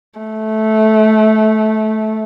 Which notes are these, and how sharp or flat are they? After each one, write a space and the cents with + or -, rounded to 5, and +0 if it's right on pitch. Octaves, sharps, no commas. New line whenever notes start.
A3 -15